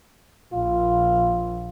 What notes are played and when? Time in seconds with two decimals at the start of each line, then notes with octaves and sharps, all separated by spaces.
0.53 A#1 F4